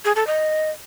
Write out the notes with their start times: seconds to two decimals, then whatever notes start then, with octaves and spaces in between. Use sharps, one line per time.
0.05 G#4
0.16 A4
0.27 D#5